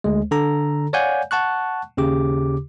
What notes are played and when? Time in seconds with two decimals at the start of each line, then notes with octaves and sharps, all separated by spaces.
0.04 D2 G#3
0.31 D3 A4 A#5
0.93 C#5 D5 F5 F#5 G#5 G6
1.31 F#5 A5 C#6 F#6
1.97 D#2 C#3 G4 D6